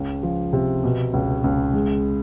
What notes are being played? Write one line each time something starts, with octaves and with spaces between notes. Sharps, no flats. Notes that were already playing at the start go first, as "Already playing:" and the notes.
Already playing: C#2
F3
C3
B2
C#2
C#2
G#3